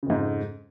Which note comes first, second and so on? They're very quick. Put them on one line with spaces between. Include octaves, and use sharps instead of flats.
C#3 F2 G#2